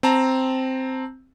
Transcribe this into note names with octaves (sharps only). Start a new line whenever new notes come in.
C4 A5 A#5